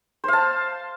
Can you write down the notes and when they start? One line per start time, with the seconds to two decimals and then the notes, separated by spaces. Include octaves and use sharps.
0.24 C5
0.28 F5
0.33 A5